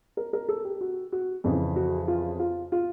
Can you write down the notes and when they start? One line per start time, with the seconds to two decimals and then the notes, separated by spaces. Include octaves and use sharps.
0.17 A#4
0.33 A#4
0.48 A4
0.65 G4
0.81 F#4
1.12 F#4
1.44 F2 C#3 E3
1.76 F#4
2.08 F4
2.39 F4
2.72 F4